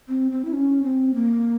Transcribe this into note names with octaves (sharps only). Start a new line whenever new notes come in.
C4
C4
E4
C#4
C4
A#3